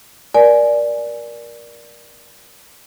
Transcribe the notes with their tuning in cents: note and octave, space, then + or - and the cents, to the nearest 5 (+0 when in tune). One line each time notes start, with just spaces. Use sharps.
A#4 +25 D5 +0 G#5 +10